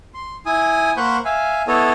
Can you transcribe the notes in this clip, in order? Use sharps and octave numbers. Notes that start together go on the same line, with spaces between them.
C6
E4 G#5 D#6
A#3 C5 F#5 B5 C#6 G6
E5 F5 G#5
B3 E4 A4 C#5 D#5